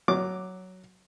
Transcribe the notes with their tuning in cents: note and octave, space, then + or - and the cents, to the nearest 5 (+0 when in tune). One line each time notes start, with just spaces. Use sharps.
F#3 +5 D6 +0